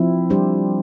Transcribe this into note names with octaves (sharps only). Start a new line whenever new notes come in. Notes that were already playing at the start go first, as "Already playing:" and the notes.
Already playing: F3 C4 E4
G3 D4 G4 C5